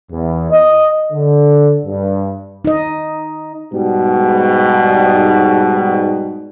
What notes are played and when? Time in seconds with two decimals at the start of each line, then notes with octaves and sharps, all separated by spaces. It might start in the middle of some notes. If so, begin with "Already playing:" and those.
0.12 E2
0.52 D#5
1.13 D3
1.86 G2
2.65 D#4 D#5
3.74 G#2 B2 G3